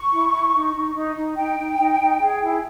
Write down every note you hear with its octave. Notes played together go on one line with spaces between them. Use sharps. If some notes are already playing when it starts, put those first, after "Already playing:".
Already playing: C#6
E4
E4
D#4
D#4
D#4
D#4
D#4 G5
D#4
D#4
D#4
G#4
E4